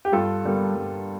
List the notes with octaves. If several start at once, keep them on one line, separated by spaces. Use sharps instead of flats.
G4
G2 F4 A4
D3 G3 A#3
G2